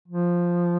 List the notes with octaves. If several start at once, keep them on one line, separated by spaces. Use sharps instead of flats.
F3